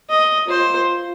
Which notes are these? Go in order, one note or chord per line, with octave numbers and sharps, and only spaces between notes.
D#5
F4 C5